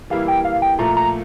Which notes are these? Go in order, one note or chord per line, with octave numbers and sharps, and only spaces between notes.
E3 G3 A#3 E4 F5
G5
F5
G5
A#2 F3 A3 A#5
A#5